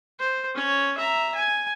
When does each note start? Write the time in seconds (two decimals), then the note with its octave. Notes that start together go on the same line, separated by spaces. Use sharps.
0.19 C5
0.55 C#4 C#5
0.98 E5 A#5
1.35 G#5